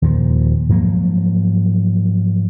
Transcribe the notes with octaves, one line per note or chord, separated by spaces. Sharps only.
D#2 A#2 D#3 F3
G#2 F3 F#3 A#3